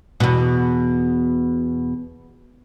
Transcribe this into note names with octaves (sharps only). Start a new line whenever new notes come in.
E2 B2